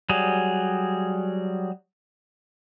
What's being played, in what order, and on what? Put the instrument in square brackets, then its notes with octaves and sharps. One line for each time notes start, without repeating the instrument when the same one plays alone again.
[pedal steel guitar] F#3 G3 G#4